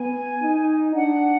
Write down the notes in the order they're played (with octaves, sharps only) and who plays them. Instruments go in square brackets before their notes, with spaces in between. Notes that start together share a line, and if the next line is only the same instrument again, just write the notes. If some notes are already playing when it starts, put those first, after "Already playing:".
Already playing: [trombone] B3 [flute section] G#5
[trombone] D#4
[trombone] D4 [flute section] F#5